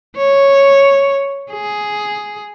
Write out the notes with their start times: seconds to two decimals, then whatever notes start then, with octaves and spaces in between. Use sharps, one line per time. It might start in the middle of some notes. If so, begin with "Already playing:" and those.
0.17 C#5
1.52 G#4